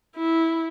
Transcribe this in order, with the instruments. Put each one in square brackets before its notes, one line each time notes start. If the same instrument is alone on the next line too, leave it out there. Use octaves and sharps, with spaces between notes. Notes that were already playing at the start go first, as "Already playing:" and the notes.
[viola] E4